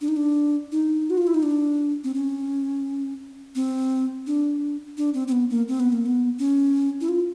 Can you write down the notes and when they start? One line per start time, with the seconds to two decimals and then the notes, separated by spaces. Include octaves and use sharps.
0.01 D4
0.08 D#4
0.16 D4
0.72 D#4
1.10 F#4
1.18 F4
1.27 E4
1.34 D#4
1.43 D4
2.04 C4
2.14 C#4
3.55 C4
4.27 D4
4.97 D4
5.14 C4
5.28 C4
5.32 B3
5.50 A#3
5.68 C4
5.80 B3
5.93 A#3
6.06 B3
6.39 C#4
7.01 E4
7.09 F4